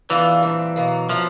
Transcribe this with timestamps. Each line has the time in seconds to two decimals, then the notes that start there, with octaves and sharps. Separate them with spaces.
0.10 E3 B3 D4 F4 G#4
0.43 A#2 G3 C4
0.76 B2 F#3 A#3
1.09 F3 F#3 B3 E4